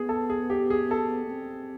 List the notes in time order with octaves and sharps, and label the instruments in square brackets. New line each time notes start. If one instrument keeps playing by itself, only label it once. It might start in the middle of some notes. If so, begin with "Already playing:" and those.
Already playing: [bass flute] B3 [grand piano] G#4
[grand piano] A4
G#4
G4
G#4
A4
[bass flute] B3
C4